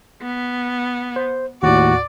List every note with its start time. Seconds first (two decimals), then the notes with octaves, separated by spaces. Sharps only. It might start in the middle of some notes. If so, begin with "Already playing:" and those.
0.22 B3
1.16 C5
1.63 D#2 A2 F#4 D5